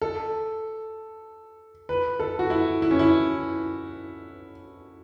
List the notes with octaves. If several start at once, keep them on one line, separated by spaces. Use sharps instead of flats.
A4
B4
A4
F#4
E4
E4
C#4
E4